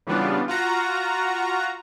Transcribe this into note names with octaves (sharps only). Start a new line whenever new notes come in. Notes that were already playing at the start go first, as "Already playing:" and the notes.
C#3 E3 G3 B3 D4 F4
F4 F#4 A#5